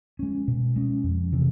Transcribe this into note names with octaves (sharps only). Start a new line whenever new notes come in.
G#3 C#4
B2
G#3 C#4
F2
C3 E3